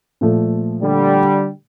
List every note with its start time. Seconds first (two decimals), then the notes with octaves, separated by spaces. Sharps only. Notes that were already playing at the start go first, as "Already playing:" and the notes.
0.21 A#2 F3 A3
0.82 D3 G3